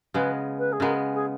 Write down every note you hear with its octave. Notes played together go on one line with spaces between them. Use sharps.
C#3 G#3 B3 B4
B4
G#4
C#3 G#3 B3 A#4
G#4